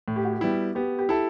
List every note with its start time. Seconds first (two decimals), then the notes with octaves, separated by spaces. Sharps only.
0.08 A2
0.16 G4
0.25 F#4
0.33 G4
0.41 G3 B3 E4
0.75 B3 G4
0.99 G4
1.09 E4 A4